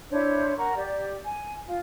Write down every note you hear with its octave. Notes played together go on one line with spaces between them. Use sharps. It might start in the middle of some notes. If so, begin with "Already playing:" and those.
D4 E4 C5 C#5
A#4 F#5 A#5 C#6
G4 D5
G#5
F4